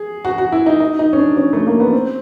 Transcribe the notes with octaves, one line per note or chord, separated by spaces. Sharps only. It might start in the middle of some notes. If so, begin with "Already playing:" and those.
Already playing: G#4
F#4
F#4
E4
D#4
D#4
D#4
C#4
D4
C#4
A3
A#3
B3
C4